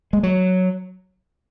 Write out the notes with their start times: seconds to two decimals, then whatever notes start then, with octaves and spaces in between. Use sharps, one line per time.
0.13 G#3
0.23 F#3